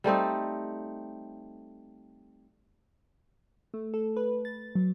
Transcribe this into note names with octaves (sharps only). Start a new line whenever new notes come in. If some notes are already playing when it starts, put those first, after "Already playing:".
G3 A3 C4 D#4
A3
A4
B4
A6
F#3